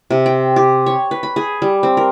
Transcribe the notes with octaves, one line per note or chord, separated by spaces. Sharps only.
C3
G5
G4
C#5
B4
B5
G#4
G3
C4
A#4